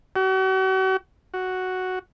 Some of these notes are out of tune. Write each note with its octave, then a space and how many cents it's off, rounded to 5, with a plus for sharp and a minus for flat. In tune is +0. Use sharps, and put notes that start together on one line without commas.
F#4 +40
F#4 +0